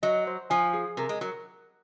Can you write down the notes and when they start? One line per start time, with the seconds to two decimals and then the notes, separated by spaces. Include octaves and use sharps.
0.03 F#3 D#5
0.27 C5
0.50 F3 G#5
0.73 G#4
0.97 C3 A#4
1.09 G#3
1.21 F#3 A#4